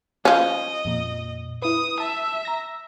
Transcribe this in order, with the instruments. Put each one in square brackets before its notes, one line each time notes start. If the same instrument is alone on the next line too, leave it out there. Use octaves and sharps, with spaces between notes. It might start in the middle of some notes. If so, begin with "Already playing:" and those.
[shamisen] F3 C#4 [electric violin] D#5
[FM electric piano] F2 A#2
[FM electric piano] E4 B4 [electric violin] D#6
[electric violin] E5 [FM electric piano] A5
[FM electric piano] A#5 A#6